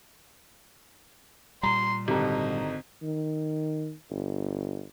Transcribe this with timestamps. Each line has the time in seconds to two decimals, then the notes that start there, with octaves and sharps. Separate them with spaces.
1.63 A#2 G3 A#5 C6
2.08 G#1 D3 D#4 G4 A#5
3.02 D#3
4.10 G1